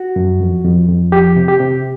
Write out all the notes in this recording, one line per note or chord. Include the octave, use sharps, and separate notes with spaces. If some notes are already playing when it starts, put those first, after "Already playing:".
Already playing: F#4
F#2
F2
F2
F2
F3 G4
C3
G4
C3